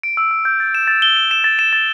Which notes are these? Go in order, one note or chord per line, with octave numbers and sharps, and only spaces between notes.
D7
E6
E6
G6
A6
E7
A6
G7
E7
E7
A6
E7
A6